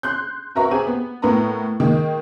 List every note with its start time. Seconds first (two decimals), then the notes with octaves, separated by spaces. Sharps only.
0.03 C6 F#6 G6
0.55 F#4 A#4 B4 E5 A#5 C#6
0.71 C4 G4 G#4 D#7
0.87 B3
1.22 A2 B3 A#4 B4 A#5
1.80 D#3 G#3 A#3